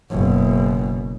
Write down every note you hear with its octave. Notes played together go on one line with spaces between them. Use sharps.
F#1 B2